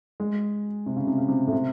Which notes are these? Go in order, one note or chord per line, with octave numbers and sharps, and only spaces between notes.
G#3
C3
C#3
C3
C#3
C3
A2
C3